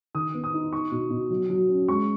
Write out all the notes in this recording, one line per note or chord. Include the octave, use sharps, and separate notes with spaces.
D#3 D#6
B3
D#6
D#4
D#4 C#6
B2
B2
F#3
F#3
C#4
G#3 C#6